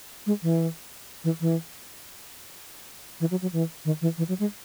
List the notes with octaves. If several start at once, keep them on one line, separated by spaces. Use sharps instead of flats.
G#3
E3
E3
E3
E3
F#3
F#3
E3
D#3
E3
E3
F#3
G#3